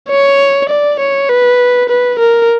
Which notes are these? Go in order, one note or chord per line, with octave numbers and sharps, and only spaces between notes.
C#5
D5
C#5
B4
B4
A#4